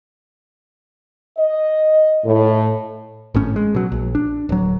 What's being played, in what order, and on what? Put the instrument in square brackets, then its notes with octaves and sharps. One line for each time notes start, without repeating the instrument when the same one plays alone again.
[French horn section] D#5
A2
[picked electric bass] G#1 A2 C#4
G#3
B2 F#3
A#1
D4
D1 F#3